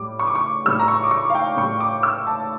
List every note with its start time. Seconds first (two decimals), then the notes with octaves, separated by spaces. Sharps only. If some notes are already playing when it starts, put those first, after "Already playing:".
Already playing: A2 G3 D6
0.19 C#6
0.27 D6
0.35 C#6
0.65 A2 G3 E6
0.79 A#5
0.88 C#6
1.04 D6
1.11 C#6
1.30 F5
1.35 G5
1.57 A2 G3 C#6
1.80 D6
2.03 E6
2.27 A5